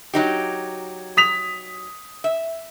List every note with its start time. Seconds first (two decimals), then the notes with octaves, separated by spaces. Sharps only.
0.14 F#3 D#4 G4
1.17 D#6 B6 F7
2.24 E5